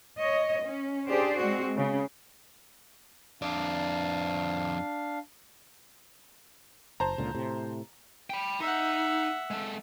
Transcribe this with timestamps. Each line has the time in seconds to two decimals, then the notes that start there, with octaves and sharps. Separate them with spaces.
0.20 C#5 D#5
0.63 C#4
1.09 D4 G4 G#4 C5 D5
1.39 G#3 C4 F#4
1.76 C#3
3.42 F2 D4 D5 F5
7.00 F#1 C5 A5 A#5
7.18 C#2 A#2 D3
7.35 A2 C3
8.30 G5 B5
8.60 D#4 E5 F#5
9.51 G#3 A4